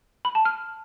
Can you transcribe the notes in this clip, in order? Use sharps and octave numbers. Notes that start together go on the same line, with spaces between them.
B5
A5
F6